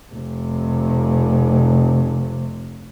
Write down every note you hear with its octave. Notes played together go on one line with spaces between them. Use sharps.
F1 C3